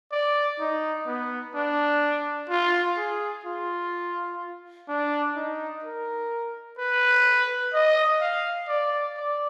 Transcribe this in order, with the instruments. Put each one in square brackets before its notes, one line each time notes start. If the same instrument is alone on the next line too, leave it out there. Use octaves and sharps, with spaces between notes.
[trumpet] D5
D#4
B3
D4
F4
G#4
F4
D4
D#4
A#4
B4
D#5
F5
D5
D5